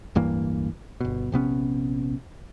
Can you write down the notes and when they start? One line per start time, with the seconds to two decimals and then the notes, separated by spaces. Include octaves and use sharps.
0.15 D1 G2 E3 A#3
1.01 G1 B2
1.32 A#1 C3 B3 C#4